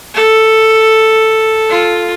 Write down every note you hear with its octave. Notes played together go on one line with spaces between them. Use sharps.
A4
F4